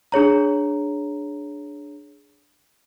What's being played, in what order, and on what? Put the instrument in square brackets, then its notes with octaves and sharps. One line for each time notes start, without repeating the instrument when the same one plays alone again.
[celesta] D4 G#4 C#5 A#5